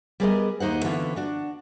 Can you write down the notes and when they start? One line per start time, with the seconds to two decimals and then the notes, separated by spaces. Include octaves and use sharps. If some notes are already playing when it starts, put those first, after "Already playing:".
0.20 G3 B3 G#4 A#4 D5 D#5
0.60 D#2 D#4 C5 F#5
0.84 D3 E3 B3 C#4 F4
1.16 D4 F#4